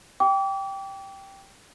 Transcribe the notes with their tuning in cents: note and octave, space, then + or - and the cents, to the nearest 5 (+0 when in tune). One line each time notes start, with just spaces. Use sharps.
G5 +0 D6 -35